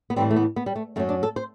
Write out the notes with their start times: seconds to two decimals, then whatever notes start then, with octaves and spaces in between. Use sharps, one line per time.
0.10 B3
0.16 A2 E3 G3 C4
0.31 A3
0.36 B3
0.56 B3
0.66 G3
0.76 A3
0.96 F#2 A3
1.00 F#3
1.09 D4
1.23 A4
1.36 C5